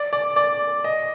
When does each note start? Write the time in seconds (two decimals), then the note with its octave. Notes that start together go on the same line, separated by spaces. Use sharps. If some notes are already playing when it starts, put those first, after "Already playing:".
Already playing: D5
0.13 D5
0.36 D5
0.84 D#5